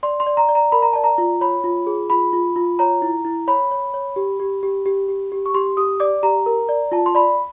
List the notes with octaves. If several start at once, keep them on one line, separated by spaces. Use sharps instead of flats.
D5 C6
C6
D5
A#5
D5
A#5
A#4 B5
A#5
D5 A5
A#5
F4
C#5 B5
F4
G#4
F4 B5
F4
F4
C#5 A#5
E4
E4
C#5 B5
C#5
C#5
G4
G4
G4
G4
G4
G4
C#6
G4 C6
G4 D#6
D5 D6
G4 A#5
A#4
D5
F4 A5
C6
D5 B5